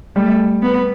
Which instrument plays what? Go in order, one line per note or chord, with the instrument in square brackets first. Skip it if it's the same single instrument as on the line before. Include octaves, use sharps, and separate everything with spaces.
[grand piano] G3 [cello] A3
[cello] B3